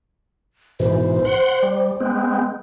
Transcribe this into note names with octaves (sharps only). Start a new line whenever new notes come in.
G#2 B2 E3 C5
F#5 C6
G3
G#3 B3 C4